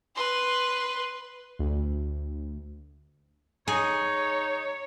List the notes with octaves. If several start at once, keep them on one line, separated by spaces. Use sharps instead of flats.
B4 C6
D2
D#4 G#4 C#5